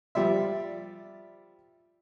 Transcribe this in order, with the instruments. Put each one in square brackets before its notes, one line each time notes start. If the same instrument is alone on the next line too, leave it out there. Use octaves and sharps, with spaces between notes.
[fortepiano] F3 G3 D5 E5